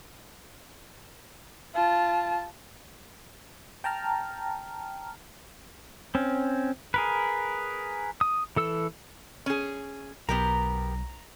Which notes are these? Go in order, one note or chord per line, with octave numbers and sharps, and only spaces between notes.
F4 A5
G5 A5 A#5 F6
C4 C#4
G#4 A#4 B4
D#6
E3 A4 E6
C#4 G#4
B1 B3 G4 A#4 A#5